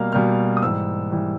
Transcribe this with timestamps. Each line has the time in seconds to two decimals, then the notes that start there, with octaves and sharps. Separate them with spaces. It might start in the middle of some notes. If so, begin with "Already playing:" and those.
Already playing: B2 G3 A#3 F6
0.12 B2 G3 A#3 F6
0.57 D#6
0.62 G#2 E3 G3 E6
1.12 E3 G3